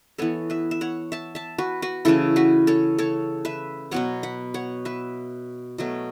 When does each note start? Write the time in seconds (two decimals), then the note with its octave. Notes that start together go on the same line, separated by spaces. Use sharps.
0.18 E3 B3 A4 C#5
0.50 B4 E5
0.71 E5
0.81 C#5 F#5
1.12 E5 A5
1.35 E5 A5
1.58 F#4 B4
1.82 F#4 B4
2.05 C#3 E3 A3 C#4 E4 A4
2.36 F#4 B4
2.67 A4 C#5
2.98 A4 C#5
3.45 B4 E5
3.91 B2 F#3 B3 C#5 F#5
4.23 F#5 B5
4.54 C#5 F#5
4.85 B4 E5
5.78 B2 F#3 A3